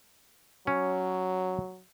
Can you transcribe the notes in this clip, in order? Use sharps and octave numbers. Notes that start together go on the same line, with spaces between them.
F#3 C#4